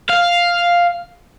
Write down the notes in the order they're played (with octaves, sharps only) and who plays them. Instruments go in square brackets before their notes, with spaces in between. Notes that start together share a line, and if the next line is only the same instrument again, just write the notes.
[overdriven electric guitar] F5